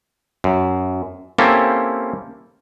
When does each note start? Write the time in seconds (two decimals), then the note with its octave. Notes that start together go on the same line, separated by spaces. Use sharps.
0.44 F#2
1.38 A#3 C4 C#4 E4 G4 A4